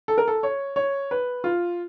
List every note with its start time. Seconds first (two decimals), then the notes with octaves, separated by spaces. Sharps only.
0.08 A4
0.18 A#4
0.28 A4
0.43 C#5
0.76 C#5
1.11 B4
1.44 F4